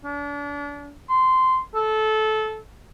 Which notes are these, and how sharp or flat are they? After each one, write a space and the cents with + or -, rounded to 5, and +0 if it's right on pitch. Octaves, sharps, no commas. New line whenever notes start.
D4 -35
C6 -15
A4 -20